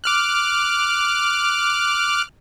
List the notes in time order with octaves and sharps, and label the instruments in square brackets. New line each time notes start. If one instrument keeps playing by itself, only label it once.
[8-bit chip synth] D6 F6 F#6